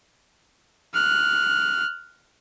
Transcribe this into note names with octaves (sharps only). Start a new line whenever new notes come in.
F6 F#6